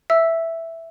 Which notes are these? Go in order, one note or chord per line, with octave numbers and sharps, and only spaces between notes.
E5 E6